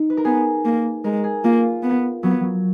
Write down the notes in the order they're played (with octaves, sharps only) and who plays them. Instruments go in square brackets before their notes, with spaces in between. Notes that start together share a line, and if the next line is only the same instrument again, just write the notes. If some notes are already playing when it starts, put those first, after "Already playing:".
Already playing: [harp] D#4
B4
A#4
[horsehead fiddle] B3 [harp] G#4
[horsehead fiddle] A#3
[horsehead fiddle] G#3 [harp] A#4
[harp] G#4
[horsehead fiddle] A#3 [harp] F4
[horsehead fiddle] B3
[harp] F#3 [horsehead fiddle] B3
[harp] F#3